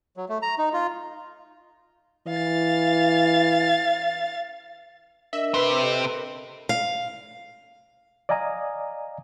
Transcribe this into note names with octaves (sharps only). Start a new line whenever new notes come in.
F#3
A3
A#5
D#4
F4
E3 F5 A6
D4 A#4 D#5 E5
C3 C4 B4
G4 A4 D#5
A#4
F5
D5 D#5 F5 G#5 A#5 D#6